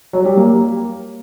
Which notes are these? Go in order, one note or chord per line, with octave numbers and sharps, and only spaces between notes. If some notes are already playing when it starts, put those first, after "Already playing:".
F#3
G3
A#3